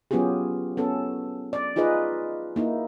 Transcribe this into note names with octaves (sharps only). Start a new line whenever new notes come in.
F#3 B3 C#4 F4 G4 G#4
B3 C#4 A4
D5
D#4 F4 G#4 B4 D#5
A#3 D#4 E4